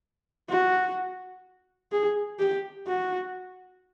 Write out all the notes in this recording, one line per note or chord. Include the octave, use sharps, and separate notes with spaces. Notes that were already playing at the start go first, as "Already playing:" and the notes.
F#4
G#4
G4
F#4